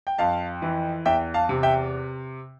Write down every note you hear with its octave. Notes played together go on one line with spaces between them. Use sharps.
G5
F2 F5 A5
E3
E2 E5 G5
F5 A5
C3
E5 G5